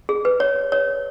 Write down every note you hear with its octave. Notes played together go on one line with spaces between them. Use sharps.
G#4
B4
C#5
C#5